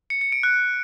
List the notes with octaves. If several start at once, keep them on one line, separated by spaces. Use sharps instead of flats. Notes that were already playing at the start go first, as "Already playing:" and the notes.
C#7
C#7
D7
F#6